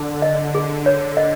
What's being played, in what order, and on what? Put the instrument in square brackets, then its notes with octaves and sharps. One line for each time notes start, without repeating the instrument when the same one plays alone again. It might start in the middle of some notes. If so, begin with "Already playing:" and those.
Already playing: [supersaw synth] D3
[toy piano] D#5
G#4
C#5
D#5